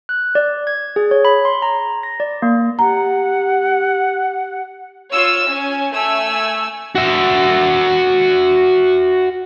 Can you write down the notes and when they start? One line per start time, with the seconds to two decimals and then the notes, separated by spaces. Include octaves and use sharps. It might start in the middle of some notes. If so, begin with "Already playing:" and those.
0.09 F#6
0.35 D5
0.67 G#6
0.96 G#4
1.11 C#5
1.25 B5
1.45 C6
1.62 A#5
2.03 A#6
2.20 D5
2.42 A#3
2.79 G4 F#5 A#5
5.12 F4 C#5 E6
5.48 C#4 G#5
5.93 A3 G#5 E6
6.96 F#4 E5